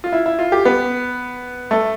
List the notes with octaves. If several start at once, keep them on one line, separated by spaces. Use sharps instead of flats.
F4
E4
E4
F4
G4
B3
A3